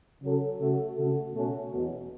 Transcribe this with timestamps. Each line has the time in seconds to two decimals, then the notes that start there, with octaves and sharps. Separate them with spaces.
0.22 C#3 F#3 C#4 A4
0.59 C#3 A3 F#4 A4
0.96 C#3 A3 F#4 A4
1.34 B2 A3 C#4 F#4 A4
1.71 E2 B2 F#3